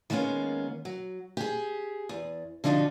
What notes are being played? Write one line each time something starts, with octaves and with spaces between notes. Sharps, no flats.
D#3 G#3 A#3 B3 C#4
F#3
G4 G#4
E2
D3 F3 D4 D#4 F#4